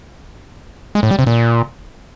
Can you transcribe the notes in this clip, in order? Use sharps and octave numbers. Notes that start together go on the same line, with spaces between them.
G#3
A2
G3
C3
A#2